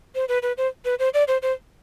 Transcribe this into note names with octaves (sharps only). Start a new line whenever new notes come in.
C5
B4
B4
C5
B4
C5
D5
C5
C5